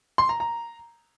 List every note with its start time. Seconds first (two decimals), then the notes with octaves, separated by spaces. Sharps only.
0.18 C6
0.29 A#5
0.40 A#5